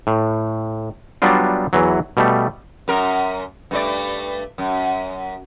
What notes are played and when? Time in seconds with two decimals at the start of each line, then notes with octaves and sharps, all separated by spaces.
0.07 A2
1.22 F#3 G3 B3 D4 F4
1.73 E2 E3 F#3
2.17 B2 G3 A3
2.88 F#2 A#4
3.71 G2 A3 D5
4.58 F#2